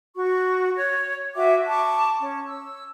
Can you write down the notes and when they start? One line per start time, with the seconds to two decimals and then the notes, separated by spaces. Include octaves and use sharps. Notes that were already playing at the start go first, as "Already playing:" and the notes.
0.15 F#4 C#6
0.76 C#5
1.35 F#4 E5 G5 D6
1.67 A5 C#6 D6
2.21 C#4
2.45 E6